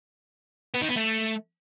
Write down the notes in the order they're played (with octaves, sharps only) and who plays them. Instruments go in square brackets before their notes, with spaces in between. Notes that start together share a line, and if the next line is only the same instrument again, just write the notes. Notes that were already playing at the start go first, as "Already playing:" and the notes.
[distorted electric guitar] B3
D#3
B3
A3